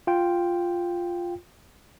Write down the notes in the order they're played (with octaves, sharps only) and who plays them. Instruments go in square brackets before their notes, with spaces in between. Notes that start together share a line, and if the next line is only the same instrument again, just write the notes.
[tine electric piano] F4 G5